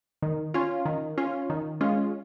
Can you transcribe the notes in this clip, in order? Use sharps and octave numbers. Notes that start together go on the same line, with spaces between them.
D#3
C#4 F4
D#3
C#4 F4
D#3
G#3 C#4 F4